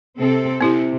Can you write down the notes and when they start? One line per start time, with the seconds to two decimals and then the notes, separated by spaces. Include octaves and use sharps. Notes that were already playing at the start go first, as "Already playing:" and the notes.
0.17 C3 C4 A4
0.61 C3 C4 E4 G4